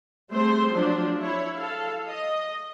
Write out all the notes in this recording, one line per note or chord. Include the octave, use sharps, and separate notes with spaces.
G3 A3 C4 G#4 C5 C6
F3 F#3 D4
E4 C#5
A4 F5
D#5